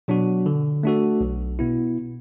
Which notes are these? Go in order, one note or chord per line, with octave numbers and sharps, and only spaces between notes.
B2 F#3 D4 F#4
D3
A3 D4 F#4 A4
B1
B2 B3 E4